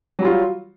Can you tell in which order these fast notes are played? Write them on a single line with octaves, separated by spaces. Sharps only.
F#3 G3 F4